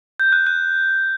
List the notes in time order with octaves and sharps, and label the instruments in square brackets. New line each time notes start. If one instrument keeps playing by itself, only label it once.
[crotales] G6
F#6
F#6